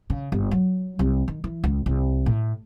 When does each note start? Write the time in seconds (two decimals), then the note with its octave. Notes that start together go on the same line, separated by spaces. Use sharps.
0.10 C#3
0.32 G1
0.51 F#3
0.99 C2
1.28 D#3
1.44 E3
1.64 C#2
1.86 C2
2.26 A2